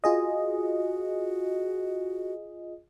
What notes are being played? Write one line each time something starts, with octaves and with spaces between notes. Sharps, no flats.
F4 F#4 G#4 D#5